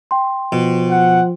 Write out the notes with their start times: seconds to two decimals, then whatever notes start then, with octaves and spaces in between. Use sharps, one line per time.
0.11 G5 C6
0.52 B2 F3
0.91 F#5